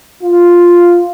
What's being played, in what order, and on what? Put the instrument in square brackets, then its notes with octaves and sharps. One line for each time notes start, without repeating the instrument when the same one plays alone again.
[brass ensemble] F4